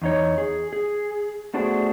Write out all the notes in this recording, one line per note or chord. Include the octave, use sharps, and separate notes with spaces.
E2 D#4 C#5
G#4
G#4
A3 B3 D4 F#4 G#4 C5